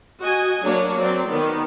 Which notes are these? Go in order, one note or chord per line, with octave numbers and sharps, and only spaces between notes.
F#4 D#5 G#5
F#3 A#3 D4 C#5
F#3 C4 D5
D#3 B3